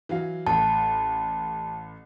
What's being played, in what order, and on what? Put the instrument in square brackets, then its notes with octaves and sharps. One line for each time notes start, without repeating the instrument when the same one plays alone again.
[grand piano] E3 F#3 F5
[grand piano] A1 [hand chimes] A5